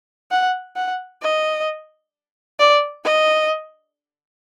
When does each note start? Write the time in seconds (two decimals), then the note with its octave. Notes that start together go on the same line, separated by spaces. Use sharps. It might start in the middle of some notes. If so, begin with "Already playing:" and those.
0.31 F#5
0.76 F#5
1.22 D#5
2.59 D5
3.04 D#5